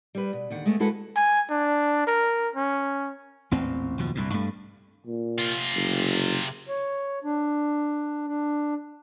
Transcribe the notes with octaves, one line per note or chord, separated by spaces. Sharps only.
G3 B4
B2
D#2 D3 F#5
G#3 A3 B3
G#3 E4 F#4 A4 B4 F#5
G#5
D4
A#4
C#4
A1 E2 A#2 C4
F#1 D#2 B2 F3
C2 G2 A#2
G2 A3
A#2
C3 F4
F#1
C#5
D4
D4